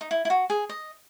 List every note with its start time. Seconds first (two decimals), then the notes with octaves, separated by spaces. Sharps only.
0.01 D#4
0.11 E4
0.25 E4
0.30 F#4
0.50 G#4
0.69 D#5